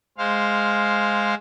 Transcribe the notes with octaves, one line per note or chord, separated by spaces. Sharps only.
G#3 C5 F5